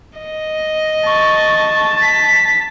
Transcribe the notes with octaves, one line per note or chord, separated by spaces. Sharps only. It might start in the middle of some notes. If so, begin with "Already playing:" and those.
D#5
A5 C#6
B6